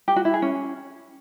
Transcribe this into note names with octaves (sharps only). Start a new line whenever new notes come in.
G4
F#4
E4
G#4
C#4